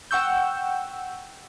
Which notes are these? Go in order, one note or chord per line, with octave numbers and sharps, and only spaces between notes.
F#5 G5 C#6 E6 G6